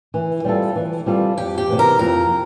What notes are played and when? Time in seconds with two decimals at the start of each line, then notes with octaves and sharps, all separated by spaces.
0.14 E3
0.44 G3 C4 F4 A4
0.76 E3
1.06 G3 C4 F4 A4
1.38 F2 G4
1.58 G4
1.69 C3 E3
1.79 A#4
1.99 F2 A#4